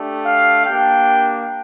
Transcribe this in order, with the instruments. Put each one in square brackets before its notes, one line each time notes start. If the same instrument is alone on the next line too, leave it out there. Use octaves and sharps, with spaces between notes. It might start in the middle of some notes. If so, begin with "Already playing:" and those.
Already playing: [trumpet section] A3 D4 G4
F5
A#3 D4 G4 G5